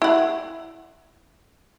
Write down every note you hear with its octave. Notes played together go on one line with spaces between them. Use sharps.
E4 F#5